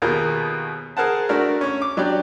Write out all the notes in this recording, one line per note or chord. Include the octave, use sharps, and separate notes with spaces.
D#2 B2 F4 G#4 A#4
G#4 A#4 C5 F#5 A5
A3 D4 F#4 A#4
C#4 C#6
D6
F#3 D4 G4 D5